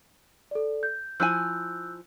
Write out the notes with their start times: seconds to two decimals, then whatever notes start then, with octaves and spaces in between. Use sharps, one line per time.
0.51 A4 D5
0.83 G6
1.20 F3 E4 G#5 E6 F#6 G6